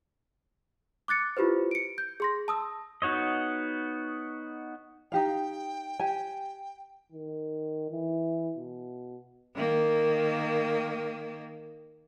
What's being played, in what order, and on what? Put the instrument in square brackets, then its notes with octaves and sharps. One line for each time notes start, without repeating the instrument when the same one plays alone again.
[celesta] D6 F#6 A6 C#7
E4 F4 G4 B4 C5
C#7 D7
G6
G#4 C6 A#6
A5 D#6 E6
[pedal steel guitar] B3 D#4 F#4 C#5 D#5
[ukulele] D#4 G4 F5 [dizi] G5
[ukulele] G4 G#5
[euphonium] D#3
E3
B2
[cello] D#3 A#3